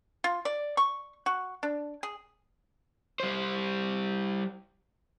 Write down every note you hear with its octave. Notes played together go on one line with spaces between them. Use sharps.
F4
D5
C#6
F#4
D4
G#4
G3 C5